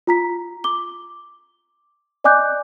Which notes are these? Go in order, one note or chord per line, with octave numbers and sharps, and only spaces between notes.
F4 A#5 B6
D6 G7
D5 D#5 G#5 D6 F#6 G6